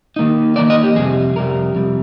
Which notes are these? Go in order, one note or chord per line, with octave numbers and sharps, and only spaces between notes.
D#3 A#3 D#4
D#3 A#3 D#4 D5
D#5
G4
F2 C3 G3 G#4
F2 C3 G3 A#4
F2 C3 G3